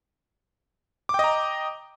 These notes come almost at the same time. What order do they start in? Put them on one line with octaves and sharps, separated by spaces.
D6 G5 D#5 A#5